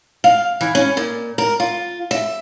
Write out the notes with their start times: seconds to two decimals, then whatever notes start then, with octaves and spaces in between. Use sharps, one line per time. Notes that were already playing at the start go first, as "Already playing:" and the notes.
0.24 F5
0.61 E3
0.75 C#4
0.97 A#2
1.38 A#4
1.60 F4
2.11 E5